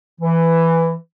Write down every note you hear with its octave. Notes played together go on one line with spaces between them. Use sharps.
E3